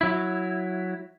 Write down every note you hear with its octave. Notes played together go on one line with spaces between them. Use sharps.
F#3 E4